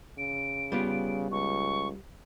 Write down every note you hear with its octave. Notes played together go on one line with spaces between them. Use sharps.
C#3 D7
G3 B3 F4
C#2 C#6